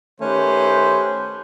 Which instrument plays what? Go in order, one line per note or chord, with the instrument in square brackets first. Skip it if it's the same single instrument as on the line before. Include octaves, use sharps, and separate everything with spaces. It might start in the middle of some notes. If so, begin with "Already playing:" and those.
[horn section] D#3 A3 C#4 G4 B4 C5